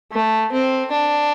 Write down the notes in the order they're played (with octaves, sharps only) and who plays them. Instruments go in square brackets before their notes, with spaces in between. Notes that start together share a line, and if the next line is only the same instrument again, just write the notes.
[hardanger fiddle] A3
C4
D4